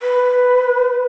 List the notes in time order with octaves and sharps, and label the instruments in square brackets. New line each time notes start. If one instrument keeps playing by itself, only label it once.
[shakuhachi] B4